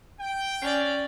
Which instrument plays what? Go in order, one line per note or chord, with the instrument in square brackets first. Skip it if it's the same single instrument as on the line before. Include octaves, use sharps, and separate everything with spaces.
[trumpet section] G5
[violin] C#4 D5